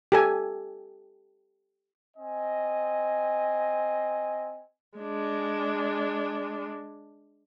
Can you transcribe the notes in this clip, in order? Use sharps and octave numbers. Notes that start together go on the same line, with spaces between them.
G4 A4 G#5
C4 D#5 G#5
G#3 D4